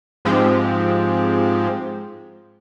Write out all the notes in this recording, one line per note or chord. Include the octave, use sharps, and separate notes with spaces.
G#2 F3 G#3 C4 G4